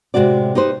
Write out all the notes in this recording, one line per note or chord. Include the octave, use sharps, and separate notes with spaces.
A2 C3 D#3 G#3 F#4 D5
D#4 G4 B4 C5